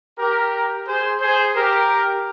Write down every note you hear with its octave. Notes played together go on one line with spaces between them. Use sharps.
G4 A#4
G#4 C5
G#4 C5
G4 A#4